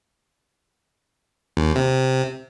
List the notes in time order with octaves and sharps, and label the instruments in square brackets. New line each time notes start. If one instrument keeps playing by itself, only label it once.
[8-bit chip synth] D#2
C3